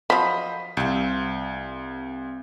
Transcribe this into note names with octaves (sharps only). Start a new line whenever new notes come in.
F3 F#3 C5 D#5 B5 B6
C2 C4 F4